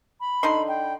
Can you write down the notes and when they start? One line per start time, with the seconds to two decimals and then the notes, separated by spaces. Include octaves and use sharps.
0.20 B5
0.43 D3 D#4 C6
0.68 G5